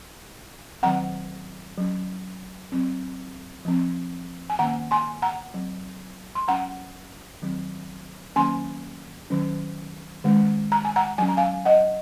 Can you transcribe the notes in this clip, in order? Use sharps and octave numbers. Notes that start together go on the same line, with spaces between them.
D#3 F#3 C4 F#5 A#5
F#3 C#4
F#3 C4
F3 C4
G#5
D#3 A#3 C#4 F#5 A#5
G#5 C6
F#5 A#5
F#3 C4
C6
F#3 C#4 F#5 A#5
D#3 F#3 C4
D#3 F#3 A#3 C#4 G#5 C6
D#3 F#3 C#4
D#3 G#3 C#4
A#5
G#5
F#5 A#5
F#3 C#4 G#5
A#5
F5 G#5
D#5 F#5